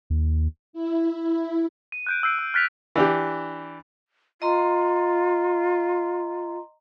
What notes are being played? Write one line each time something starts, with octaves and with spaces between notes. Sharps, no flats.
D#2
E4
D#7
F#6 G6 D7
E6 G6 C7 D7
E6
F6 F#6 A6 B6 C7 F7
E3 D4 G4
F4 D#5 A#5 C6